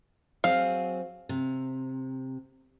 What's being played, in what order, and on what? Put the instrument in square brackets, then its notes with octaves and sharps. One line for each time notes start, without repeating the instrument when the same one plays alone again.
[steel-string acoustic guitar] F#3 C4 G#4 [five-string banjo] F5
[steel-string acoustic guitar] C3